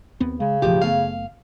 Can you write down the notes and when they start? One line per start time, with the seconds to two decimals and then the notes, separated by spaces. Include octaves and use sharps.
0.20 D#2 B3 C4
0.40 C#3 G#3
0.62 F#1 B1 A2 F3 G4
0.82 F#1 A3 B3 F5